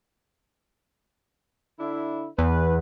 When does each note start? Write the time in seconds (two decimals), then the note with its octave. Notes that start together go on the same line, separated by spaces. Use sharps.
1.79 D3 D4 E4
2.38 E2 B4